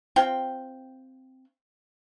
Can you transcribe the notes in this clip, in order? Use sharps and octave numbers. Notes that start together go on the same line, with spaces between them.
C4 F4 G5